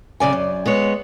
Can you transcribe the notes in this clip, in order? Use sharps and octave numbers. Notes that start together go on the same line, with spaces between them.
F#2 C#3 D5 G#5
F#2
G#3 B3 C#5